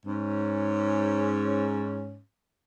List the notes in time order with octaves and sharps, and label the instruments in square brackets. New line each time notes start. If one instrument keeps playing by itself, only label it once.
[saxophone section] G#2 C#4